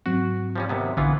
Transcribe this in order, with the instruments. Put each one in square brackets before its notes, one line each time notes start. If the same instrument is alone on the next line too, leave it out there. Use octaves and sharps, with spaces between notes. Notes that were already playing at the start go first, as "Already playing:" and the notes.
[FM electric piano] G#2 F#3 C4 [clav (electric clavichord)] F#4
[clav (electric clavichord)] F3 G3 C#4
D#2 C3 B3
[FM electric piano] A#1 D3 [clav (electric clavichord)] E3 B3 F4